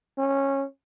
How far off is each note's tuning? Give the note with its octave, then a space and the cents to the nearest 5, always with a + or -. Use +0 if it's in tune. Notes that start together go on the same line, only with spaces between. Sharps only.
C#4 -15